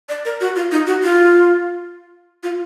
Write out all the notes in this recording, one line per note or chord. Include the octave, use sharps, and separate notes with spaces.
D5
A#4
F#4
F4
D#4
F#4
F4
F4